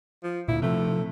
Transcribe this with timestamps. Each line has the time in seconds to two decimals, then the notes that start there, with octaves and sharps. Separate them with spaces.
0.23 F3
0.48 D2 A#2 E4
0.62 C3 F3 A3